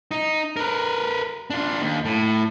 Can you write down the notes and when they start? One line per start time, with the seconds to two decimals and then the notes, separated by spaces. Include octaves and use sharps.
0.11 D#4
0.57 A#4 B4
1.50 D4 F4
1.81 D#2
2.05 A2